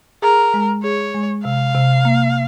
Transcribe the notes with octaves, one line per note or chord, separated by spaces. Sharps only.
G#4 A#4
G#3
G#4 C#5
G#3
C3 F5
C3
A#3